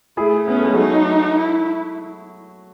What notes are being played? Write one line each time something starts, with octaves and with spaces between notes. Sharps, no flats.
A3 E4 G#4
B3 C#4
A3
G#3
F#3 A3 D#4
E4